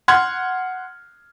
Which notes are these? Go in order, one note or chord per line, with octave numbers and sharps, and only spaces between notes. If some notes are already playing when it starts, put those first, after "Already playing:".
F#5 C6 F6 G#6